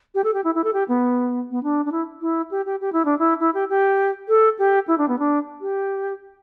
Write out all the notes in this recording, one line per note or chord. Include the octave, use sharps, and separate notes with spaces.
G4
A4
G4
E4
E4
A4
G4
B3
B3
D4
D4
E4
E4
G4
G4
G4
E4
D4
E4
E4
G4
G4
A4
G4
E4
D4
B3
D4
G4